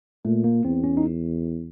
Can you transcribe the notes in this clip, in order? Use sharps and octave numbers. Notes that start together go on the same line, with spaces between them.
A#2 A3
A#3
E2 C4
C#4
D#4